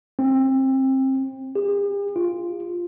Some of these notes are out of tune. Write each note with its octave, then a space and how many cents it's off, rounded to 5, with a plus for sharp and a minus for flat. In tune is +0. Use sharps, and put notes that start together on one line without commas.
C4 +25
G4 +45
F4 -5